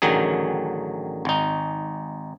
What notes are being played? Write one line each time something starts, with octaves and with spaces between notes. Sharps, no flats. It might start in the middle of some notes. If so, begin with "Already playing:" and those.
A1 D3 D#3 F#3 G#4
G#1 D#4